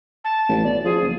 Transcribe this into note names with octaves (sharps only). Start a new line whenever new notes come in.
A5
A1
B2 D5
F3 G#4
F#1